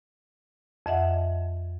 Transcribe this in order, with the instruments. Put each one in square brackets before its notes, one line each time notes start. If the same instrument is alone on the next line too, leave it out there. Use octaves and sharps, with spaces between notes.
[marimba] F2 D#5 E5 F#5